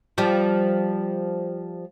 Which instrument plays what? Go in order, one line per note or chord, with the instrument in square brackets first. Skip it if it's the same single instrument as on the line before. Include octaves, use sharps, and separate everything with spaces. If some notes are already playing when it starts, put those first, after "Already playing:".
[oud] F3 G3